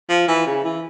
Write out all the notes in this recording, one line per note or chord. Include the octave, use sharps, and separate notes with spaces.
F3
E3
C#3
E3